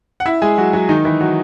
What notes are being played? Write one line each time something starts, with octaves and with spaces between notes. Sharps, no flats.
F#5
E4 E5
G#3 G#4
F#3 F#4
F#3 F#4
D#3 D#4
E3 E4
F#3 F#4